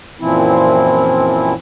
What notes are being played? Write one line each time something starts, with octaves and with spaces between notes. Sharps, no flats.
F#2 A#2 E3 F3 C4 E4